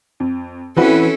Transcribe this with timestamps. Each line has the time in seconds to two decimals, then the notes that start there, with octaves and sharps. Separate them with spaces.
0.20 F2
0.77 E3 C4 C#4 E4 F#4 A4 B4